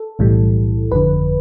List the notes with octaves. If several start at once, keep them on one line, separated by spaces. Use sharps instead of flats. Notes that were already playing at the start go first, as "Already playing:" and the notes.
Already playing: A4
B1 A2 E3 G3
G1 F2 D3 B4